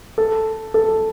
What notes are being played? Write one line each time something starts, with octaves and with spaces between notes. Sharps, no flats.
A4
A4